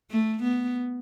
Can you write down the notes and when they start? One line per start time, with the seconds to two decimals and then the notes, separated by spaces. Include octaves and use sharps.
0.11 A3
0.42 B3